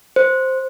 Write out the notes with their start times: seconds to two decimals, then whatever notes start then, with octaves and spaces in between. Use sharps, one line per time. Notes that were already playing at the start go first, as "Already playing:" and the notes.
0.16 C5